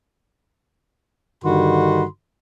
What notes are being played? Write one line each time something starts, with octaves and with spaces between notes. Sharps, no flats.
G2 D3 D#3 F#4 B5 C6